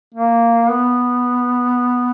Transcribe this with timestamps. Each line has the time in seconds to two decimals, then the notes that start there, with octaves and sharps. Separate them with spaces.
0.14 A#3
0.70 B3